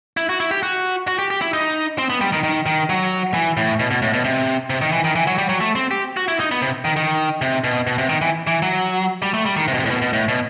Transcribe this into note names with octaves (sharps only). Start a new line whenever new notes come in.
E4
F#4
E4
G4
F#4
F#4
G4
G4
E4
D#4
C4
B3
G3
D#3
D#3
D#3
F#3
E3
A2
B2
B2
A2
B2
C3
C3
D#3
E3
D#3
E3
F#3
G3
F#3
A3
C4
G4
F#4
E4
D#4
B3
C3
D#3
D#3
C3
B2
B2
C3
D#3
E3
E3
F#3
G3
A3
G3
D#3
C3
B2
C3
A2
B2
B2
A2
B2